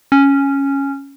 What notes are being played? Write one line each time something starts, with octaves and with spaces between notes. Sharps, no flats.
C#4